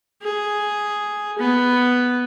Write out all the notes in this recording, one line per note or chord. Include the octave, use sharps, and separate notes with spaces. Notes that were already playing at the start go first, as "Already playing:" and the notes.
G#4
B3